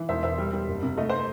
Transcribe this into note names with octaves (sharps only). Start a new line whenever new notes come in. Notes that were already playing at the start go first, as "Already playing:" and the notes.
Already playing: E3
E1 C5 E5
E1 C5 E5
G3
G3
F#1
C3
A3 D#5
C5